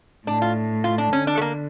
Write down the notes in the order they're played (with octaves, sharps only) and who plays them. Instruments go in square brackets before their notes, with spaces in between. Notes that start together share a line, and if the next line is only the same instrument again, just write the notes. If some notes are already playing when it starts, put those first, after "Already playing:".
[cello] A2 [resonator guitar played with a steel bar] D4
[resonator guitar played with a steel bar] F4
F4
D4
[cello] D3 [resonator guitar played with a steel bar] C#4
[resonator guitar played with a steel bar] D4
A3
A#3